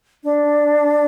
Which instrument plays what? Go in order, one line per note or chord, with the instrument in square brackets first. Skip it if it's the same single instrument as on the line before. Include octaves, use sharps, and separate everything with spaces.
[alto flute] D4